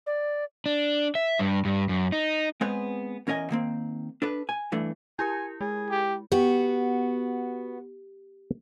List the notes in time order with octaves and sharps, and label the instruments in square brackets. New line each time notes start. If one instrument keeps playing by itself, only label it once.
[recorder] D5
[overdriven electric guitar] D4
E5
G2
G2
F#2
D#4
[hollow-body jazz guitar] G#3 B3 C4 G#4 B4 C#5
E2 C#4 A#4 D#5 G#5
D#3 A#3 C4
D4 A4 B4
G#5
G2 E3 A3 D4
[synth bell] E4 G4 A#4 [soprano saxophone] G#5
[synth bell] G#3 [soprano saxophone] G#4
[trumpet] G4
[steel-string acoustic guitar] B3 F#4 [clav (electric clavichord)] G4